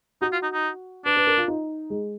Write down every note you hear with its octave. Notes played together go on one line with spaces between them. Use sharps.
D#4 F#4
F4
D#4
D#4
D4 B4
B4
A#4
F4
D#4
G#3